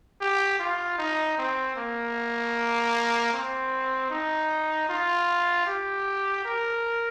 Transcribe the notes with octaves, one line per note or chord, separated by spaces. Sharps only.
G4
F4
D#4
C4
A#3
C4
D#4
F4
G4
A#4